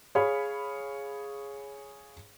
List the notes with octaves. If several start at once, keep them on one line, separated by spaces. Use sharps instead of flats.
G#4 C#5 F5 B5